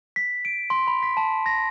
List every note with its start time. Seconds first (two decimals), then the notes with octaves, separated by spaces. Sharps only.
0.16 B6
0.45 D7
0.70 C6
0.87 B5
1.03 B6
1.17 A5
1.46 A#6